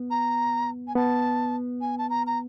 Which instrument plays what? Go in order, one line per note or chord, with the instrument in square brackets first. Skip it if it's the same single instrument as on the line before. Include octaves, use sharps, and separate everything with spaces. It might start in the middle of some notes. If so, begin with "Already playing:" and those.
Already playing: [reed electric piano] B3
[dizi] A#5
G#5
[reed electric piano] B3 [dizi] A5
[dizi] G#5
A5
A#5
A#5